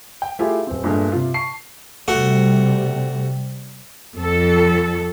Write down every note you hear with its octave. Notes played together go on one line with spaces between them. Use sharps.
G5
A3 E4 F4 G4 G#4
D1 C4
G2 A#2 G#3 A3
C3 F4
A5 C#6 C7
C3 G3 A3 F#4
F2 A4